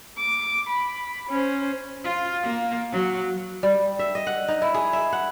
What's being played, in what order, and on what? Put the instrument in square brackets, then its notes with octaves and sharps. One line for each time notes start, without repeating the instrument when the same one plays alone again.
[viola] D6
B5
C#4 C5
[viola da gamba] F4
A#3
F#3
[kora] G3
E5
D#5
F#5
D#4
E4
G#4
E5
F#5